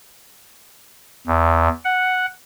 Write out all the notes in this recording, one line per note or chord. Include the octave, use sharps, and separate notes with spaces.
E2
F#5